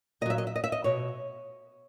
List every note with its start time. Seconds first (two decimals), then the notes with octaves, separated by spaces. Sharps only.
0.21 A#2 D#5
0.26 F#3 E5
0.38 D#5
0.47 E5
0.56 D#5
0.64 E5
0.72 D#5
0.84 B2 C#5